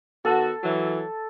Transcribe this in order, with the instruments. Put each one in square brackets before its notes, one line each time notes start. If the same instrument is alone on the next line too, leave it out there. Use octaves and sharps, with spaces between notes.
[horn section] D#3 B3 F#4 [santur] A4
[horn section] E3 F#3